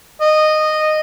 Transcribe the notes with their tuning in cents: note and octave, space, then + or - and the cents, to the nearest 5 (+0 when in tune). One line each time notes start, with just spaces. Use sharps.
D#5 -10